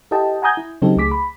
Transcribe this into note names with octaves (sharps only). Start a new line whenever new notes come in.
E4 G4 A4 D#5 G5 A5
F#5 G#5 A#5 D#6 G6 G#6
E4
C#3 F#3 C4 D#4 G4 A4
C#2 A3 G#4 D6 B6
B5